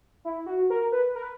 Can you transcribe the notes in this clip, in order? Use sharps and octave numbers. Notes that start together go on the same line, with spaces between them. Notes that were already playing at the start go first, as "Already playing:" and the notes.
E4
F#4
A#4
B4
A#4
B4